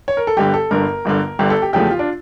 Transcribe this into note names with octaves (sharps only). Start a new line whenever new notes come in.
C#5
A#4
A4
G1 G2 D3 G4
A4
G1 G2 D3 A#4
G1 G2 D3
G1 G2 D3 G4
A4
G4
E2 C#3 F3 A3 G4
F4
D4